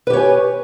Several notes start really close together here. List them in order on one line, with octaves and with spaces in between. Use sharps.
B4 G4 C#5 G#5